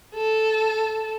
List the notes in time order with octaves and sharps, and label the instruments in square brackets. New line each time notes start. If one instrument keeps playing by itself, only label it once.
[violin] A4